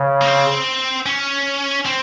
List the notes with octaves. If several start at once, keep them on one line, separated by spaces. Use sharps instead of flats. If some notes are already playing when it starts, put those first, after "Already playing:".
Already playing: C#3
A#3
C4
C#4
C4